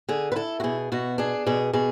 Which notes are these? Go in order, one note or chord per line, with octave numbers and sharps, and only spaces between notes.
D3 G#4
B4
E4 A4
F#4
B2 G#4
B2 F#4
D4 G#4
B2 G#4
B2 G#4